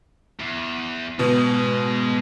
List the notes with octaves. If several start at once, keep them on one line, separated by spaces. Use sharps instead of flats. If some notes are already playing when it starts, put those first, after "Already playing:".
E2
G#2 B2 G#3